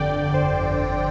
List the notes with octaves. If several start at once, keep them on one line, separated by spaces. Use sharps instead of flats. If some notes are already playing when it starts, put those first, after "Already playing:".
Already playing: G1 F2 D3 D5 G5
D5
C5